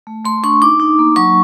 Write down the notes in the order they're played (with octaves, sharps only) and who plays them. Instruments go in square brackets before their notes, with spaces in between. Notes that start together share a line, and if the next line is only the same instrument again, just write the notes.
[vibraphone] A3
A3 C6
D4 C#6
D#4 D6
D#4
A#3
F#3 C#6